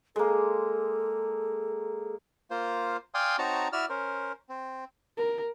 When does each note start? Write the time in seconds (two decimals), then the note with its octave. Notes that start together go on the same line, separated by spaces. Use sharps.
0.16 G#3 A#3 A4
2.51 A#3 F4 C5
3.14 D5 F5 G5 G#5 C6 D#6
3.38 C4 D#4 F#4 C#5 A5 A#5
3.73 E4 F#4 D5 E6 F6
3.89 C#4 A#4 C5
4.49 C4
5.18 A#4